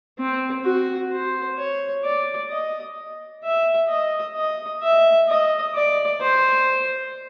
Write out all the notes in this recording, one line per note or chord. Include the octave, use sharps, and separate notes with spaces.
C4
F#4
C5
C#5
D5
D#5
E5
D#5
D#5
E5
D#5
D5
C5